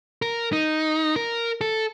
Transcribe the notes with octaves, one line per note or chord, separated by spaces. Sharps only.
A#4
D#4
A#4
A4